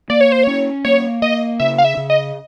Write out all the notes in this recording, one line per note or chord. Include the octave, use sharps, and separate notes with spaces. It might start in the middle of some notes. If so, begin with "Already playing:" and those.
A#3 D5
C#5
C5
C#4 C#5
A#3 C#5
A#3 D#5
C#3 E5
F5
E5
C#3
D#5